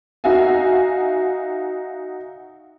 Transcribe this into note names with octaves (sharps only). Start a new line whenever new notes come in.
D#4 F#4 E5 F5 G#5